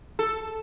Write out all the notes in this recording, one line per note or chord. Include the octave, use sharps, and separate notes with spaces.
A4